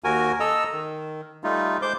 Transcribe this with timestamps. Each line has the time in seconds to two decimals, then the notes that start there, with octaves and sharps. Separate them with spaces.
0.04 D#2 F#4 A#4 G#5
0.40 A4 D#5 A#5 E6
0.72 D#3
1.44 G3 A3 D#4 F4
1.82 G#3 C5 D6 G6